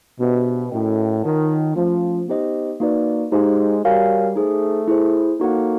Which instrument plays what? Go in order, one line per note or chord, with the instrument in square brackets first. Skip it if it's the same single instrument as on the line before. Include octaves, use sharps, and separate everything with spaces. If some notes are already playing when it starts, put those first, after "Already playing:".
[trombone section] B2 [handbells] B3 D4 G4 C5 E5
[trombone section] A2 [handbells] C#4 F#4 A#4 D#5 G5
[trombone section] D#3 [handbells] F4 A#4 C#5 F#5 A5
[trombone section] F3 [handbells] A3 C#4 F4
[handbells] B3 D#4 G4 C5 D#5
A#3 D#4 F#4 B4 D5
[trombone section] G#3 [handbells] D#4 G4 C5 F5
[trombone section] G3 [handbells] F#4 A#4 C#5 F5 G#5
[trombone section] A3 [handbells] D#4 G#4 C5
[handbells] E4 G#4 C5
[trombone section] A#3 [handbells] D#4 F#4 A4 C#5 F#5